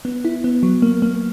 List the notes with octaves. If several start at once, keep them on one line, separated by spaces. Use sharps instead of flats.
B3
E4
B3
F#3
A#3
A#3